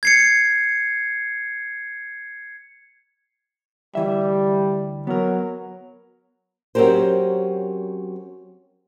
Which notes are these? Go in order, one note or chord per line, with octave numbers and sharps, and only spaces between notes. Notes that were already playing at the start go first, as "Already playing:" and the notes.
G#6 C7 C#7
D2 E3 G3 E5
F#3 B3 A#4
F#3 C4 C#4 G4 A#4 C5